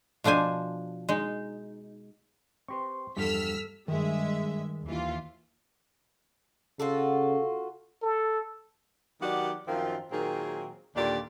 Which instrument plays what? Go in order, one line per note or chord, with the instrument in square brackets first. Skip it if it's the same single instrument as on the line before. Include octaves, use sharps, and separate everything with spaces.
[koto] B2 F3 D4 C5 G#5
G#3 D#4
[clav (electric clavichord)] C4 G4 B4 [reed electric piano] C5 C6 C#6
[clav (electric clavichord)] E2 G2 F3 [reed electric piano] G3 [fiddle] A4 [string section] E6 F6 B6
[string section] G2 G#3 E5 [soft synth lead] D#3
[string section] D#2 E3 F4
[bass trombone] C#3 [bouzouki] F4 F#4 A4
[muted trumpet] A4
[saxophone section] D#3 F#3 B3 G4 D5 F#5
F#2 D#3 F3 C4 F4
A#2 D#3 F#3 C4 G#4
D#2 A#2 D3 D4 G4 D5